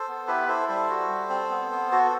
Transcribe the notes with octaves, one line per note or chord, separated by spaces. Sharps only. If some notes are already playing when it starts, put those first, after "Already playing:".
Already playing: A4 C5
B3
E4 G4 B4
E4 A4 C5
G3 A4 C5
F#4
G3
C4
B3
B3
F#4 A4